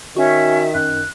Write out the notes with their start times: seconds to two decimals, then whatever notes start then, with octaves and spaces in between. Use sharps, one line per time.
0.16 D#3 C#4 F#4 E5
0.75 F#2 F#6